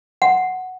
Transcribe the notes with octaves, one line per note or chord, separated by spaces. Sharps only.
F#5